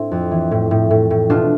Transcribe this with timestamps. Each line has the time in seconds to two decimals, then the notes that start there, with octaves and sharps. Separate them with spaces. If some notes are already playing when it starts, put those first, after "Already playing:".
Already playing: A2 C4 D4 E4
0.11 F2
0.31 E3
0.51 A2
0.71 A2
0.91 A2
1.11 A2
1.30 B2 D4 F4